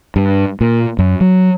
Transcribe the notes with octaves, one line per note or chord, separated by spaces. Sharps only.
G2
A#2
F#2
F#3